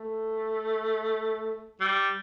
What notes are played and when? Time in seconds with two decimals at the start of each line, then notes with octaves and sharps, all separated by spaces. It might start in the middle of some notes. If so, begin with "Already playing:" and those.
Already playing: A3
1.80 G3